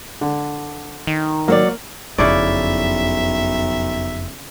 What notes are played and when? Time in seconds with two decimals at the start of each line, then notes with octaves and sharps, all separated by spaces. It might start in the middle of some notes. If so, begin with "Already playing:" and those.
0.21 D3
1.07 D#3
1.48 F#3 A#3 C#5 D5
2.18 F#1 B1 F2 C#3 E4 D5 E5